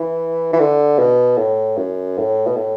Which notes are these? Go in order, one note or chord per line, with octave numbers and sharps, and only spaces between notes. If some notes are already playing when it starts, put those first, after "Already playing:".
Already playing: E3
E3
D3
B2
A2
F#2
A2
B2
A2